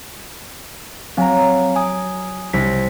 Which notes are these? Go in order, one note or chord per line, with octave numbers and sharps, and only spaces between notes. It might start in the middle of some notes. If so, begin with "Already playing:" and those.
F#3 C4 F5 G#5 A#5
G#5 D#6
C2 B6